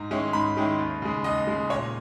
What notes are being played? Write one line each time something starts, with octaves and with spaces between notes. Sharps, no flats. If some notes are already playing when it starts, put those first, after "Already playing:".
Already playing: G#2 A#5
D#3 G#3 C#4 E4
G#2 B5
D#3 G#3 C#4 E4
D#2
C#3 G#3
D#2 D#5
C#3 G#3
A#2 C#5